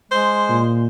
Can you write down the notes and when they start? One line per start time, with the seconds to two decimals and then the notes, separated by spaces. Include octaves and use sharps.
0.12 G#3 C5
0.49 A#2